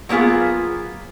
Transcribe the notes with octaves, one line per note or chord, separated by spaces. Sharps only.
F#3 A#3 B3 F4 G#4